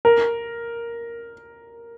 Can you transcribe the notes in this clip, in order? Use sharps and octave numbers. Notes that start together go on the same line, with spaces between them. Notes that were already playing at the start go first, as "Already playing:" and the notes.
A#4